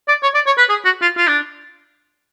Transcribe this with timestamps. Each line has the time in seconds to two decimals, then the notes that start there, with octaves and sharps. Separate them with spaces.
0.08 D5
0.23 C#5
0.34 D5
0.46 C#5
0.58 B4
0.69 G#4
0.85 F#4
1.01 F4
1.17 F4
1.27 D4